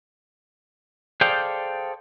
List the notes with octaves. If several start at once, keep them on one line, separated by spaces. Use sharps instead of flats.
G#4 A4 C5 D5 F5 G5